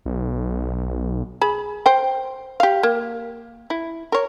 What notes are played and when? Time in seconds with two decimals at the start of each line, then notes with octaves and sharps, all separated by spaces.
0.06 B1
1.41 G#4 B5
1.86 C5 G5
2.60 G4 F5
2.83 A#3
3.70 E4
4.12 A#4 C#5